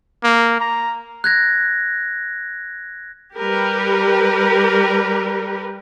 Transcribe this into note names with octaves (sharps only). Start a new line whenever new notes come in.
A#3
A#5
F#6 G#6 A#6
G3 G4 A#4 B4